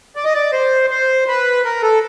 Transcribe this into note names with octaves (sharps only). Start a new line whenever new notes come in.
D5
D#5
D5
C5
C5
B4
A#4
A4